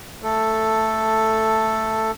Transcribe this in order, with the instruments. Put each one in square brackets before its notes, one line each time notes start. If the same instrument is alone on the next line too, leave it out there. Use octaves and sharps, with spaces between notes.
[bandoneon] A3 A4